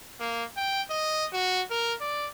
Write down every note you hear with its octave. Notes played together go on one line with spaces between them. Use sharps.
A#3
G5
D#5
F#4
A#4
D5